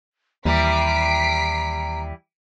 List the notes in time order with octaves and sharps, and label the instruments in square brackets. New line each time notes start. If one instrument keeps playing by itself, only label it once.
[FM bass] D#2 [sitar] E3 G3 [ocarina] A#5 [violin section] B6 C7 D7